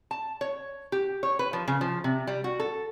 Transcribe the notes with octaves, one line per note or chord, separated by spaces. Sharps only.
A5
C#5
G4
C#5
B4
F3
C#3
F3
C3
G3
F#4
A4